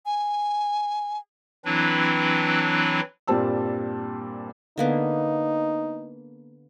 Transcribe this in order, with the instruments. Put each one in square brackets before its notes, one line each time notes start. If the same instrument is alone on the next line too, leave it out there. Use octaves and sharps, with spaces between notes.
[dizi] G#5
[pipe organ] E3 F#3 C4 D4 E4 B4
[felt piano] G2 A#2 G3 C4 A5 E6
[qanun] D3 A#3 B3 [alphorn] D#4